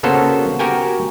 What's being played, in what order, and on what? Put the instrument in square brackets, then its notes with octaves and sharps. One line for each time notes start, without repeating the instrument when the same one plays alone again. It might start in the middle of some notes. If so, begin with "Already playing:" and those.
[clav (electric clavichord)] C#3 A#3 B3 F#4 A4 C5
F#4 G4 A#4 G5 G#5